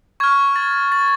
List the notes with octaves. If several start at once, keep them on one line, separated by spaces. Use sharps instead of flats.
C#6 F6 G#6
A6
A6